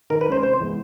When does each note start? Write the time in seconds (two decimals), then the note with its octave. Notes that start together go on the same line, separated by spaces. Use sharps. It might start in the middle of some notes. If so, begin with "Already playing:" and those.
0.10 D#3 A#4
0.21 B4
0.28 G#3 C#4 C5
0.43 C3 C5
0.60 E3 G#3 B3